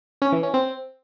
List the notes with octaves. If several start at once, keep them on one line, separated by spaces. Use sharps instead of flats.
C#4
E3
C#4
C4